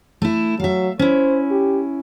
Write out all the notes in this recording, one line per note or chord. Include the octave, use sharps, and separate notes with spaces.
A3 E4
F#3 E5 F5
C#4 E4 C5
G4